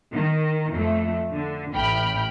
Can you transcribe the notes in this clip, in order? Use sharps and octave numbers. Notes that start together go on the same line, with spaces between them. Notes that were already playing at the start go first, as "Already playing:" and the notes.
D#3
F2 A3
D3
A1 A2 G5 B5 F6